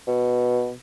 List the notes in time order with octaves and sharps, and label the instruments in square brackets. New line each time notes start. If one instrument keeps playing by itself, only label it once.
[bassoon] B2